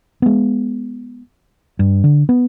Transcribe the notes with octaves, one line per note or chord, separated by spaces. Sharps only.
G#3 B3
G2
D3
B3